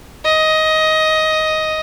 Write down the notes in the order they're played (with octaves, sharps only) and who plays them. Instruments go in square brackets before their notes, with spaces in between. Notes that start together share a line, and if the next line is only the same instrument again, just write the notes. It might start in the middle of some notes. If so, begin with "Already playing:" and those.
[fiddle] D#5